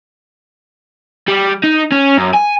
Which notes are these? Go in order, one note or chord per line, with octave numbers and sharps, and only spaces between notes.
G3
D#4
C#4
F#2
G#5